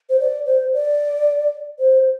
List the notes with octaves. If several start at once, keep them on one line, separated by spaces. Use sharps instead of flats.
C5
D5
C5
D5
C5